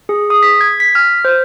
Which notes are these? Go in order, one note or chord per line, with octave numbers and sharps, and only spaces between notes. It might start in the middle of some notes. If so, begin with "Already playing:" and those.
G#4
D#6
B6
G#6
B6
F6
C5